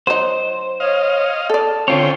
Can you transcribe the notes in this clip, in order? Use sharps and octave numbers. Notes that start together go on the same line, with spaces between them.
F#3 D#4 C5
C#5 D#5 F5
A4 D5 A5
D3 C4 C#4 F4 C#5 G5